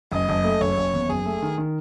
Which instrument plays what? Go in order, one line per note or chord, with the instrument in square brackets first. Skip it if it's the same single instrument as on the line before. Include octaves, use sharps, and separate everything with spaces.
[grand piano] F#1 [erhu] D#5
[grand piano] F#1
A3
[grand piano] F#1 [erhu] C#5
[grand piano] F#1
E2
[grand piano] F#1 [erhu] G#4
[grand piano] A3
D#3
D#3